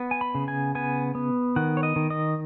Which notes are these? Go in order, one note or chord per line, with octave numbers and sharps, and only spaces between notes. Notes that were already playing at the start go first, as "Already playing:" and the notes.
Already playing: B3
G#5
B5
C#3
G#5
B3 G#5
B3
D#3 F#5
C#5
D#5
D#3
D#5